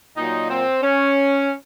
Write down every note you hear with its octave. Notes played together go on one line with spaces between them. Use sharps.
A#2 F#3 D#4
C4
C#4